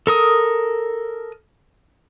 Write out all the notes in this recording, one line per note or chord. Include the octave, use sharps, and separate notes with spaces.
A4 A#4 D#6